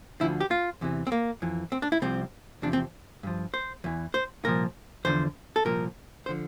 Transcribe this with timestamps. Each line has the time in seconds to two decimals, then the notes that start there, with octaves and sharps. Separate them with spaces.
0.20 D2 D3 F3 E4
0.40 G4
0.51 F4
0.81 E2 C3 E3
1.07 C4
1.12 A#3
1.42 F2 E3
1.72 C4
1.82 D4
1.92 E4
2.02 C2 C3 F3 C4
2.62 E2 C3 F3 D4
2.73 C4
3.23 G2 F3
3.54 C5
3.84 E2 E3
4.14 C5
4.44 C2 A#2 F3 A#4
5.05 E2 D3 F3 C5
5.56 A4
5.65 C2 A#2 F3 A#4
6.26 D3 F3 C5